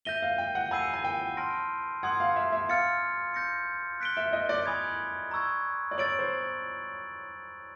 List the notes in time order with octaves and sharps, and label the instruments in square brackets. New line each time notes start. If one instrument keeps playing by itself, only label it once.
[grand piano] E5 [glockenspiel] G6 A#6 D#7 G7
[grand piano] F5
G5
F#5
[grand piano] G#5 [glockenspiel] B5 E6 G6 C7 D#7
[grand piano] G#5
G5
[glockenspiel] A5 C6 F6 A#6 D7
[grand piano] F#5 [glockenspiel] C6 D#6 G#6
[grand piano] F5
E5
E5
[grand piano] F5 [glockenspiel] F6 A6 C#7
[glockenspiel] G6 A#6 C#7
F#6 B6 D7 G7
[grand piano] E5
D#5
D5
[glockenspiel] G#5 B5 D#6 G#6
A#5 C#6 E6 G#6
[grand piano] D5
[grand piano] C#5 [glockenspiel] E6 A6 D7 F#7
[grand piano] C5